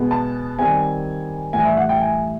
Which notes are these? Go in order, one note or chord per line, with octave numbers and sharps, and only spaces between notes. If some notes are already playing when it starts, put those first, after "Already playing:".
Already playing: B2 G#3 B3
A5
D#3 G3 C4 G#5
A2 E3 G3 G#5
E5
F#5
G5
G#5